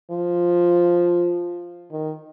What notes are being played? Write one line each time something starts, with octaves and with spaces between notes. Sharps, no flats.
F3
D#3